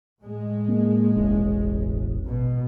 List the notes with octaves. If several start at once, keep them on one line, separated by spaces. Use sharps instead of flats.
A2 G#3
A#3
E1 A1
B2